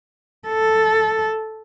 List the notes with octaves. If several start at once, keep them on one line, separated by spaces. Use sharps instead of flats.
A4